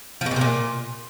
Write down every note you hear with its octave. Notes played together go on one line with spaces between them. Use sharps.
F3
B2
A#2
C3
A#2